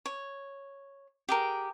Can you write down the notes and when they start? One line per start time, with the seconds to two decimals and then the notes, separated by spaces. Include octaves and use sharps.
0.06 C#5
1.29 G4 G#4 A#4